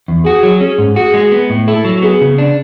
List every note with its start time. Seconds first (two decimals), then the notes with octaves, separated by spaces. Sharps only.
0.08 E2
0.26 F#4 G#4
0.43 F#3
0.61 C#4 G#4
0.78 G#2
0.96 F#4 G#4
1.14 G#3
1.32 B3
1.50 A2
1.68 E4 A4
1.85 F#3
2.02 B3 G#4
2.21 C#3
2.38 D4